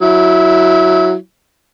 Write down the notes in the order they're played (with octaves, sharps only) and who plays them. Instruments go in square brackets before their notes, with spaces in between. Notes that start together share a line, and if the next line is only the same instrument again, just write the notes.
[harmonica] F#3 E4